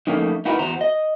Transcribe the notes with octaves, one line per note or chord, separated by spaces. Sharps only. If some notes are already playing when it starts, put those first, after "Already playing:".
F3 A3 A#3 C#4 D#4
D#4 E4 F#4 A#4 B4
E2 F#4 C5 A#5
D#5